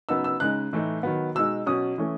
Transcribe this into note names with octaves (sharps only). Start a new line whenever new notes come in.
C#3 F#3 B3 D#4 E6
E6
C#3 G#3 D#4 F#6
A2 E3 A3 D#4
D#3 F#3 B3
B2 G#3 D#4 E6
B2 F#3 C#4 D#6
E3 A3 C#4